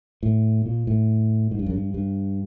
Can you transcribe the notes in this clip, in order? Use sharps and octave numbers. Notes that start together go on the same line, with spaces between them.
A2
A#2
A2
G#2
G2
F#2
G2
G2